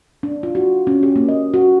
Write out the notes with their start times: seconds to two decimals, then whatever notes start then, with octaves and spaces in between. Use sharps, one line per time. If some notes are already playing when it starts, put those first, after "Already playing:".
0.23 D4
0.43 F4
0.55 F#4
0.87 C#4
1.03 G4
1.16 A#3
1.29 D#5
1.54 F#4